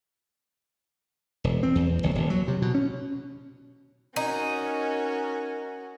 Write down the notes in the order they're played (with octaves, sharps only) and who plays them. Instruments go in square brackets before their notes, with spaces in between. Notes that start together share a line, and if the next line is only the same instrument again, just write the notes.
[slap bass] E1
C4
E2
F#1
D#1
F#3
C3
B2
C#4
[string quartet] C#4 F#4 [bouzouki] D#4 [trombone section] A#4